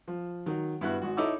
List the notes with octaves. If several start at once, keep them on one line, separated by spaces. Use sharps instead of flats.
F3
D#3 F#3
G2 B3 E4 F#4 F#6
G#1 F#4
D#4 E4 A4 C#5 D6 E6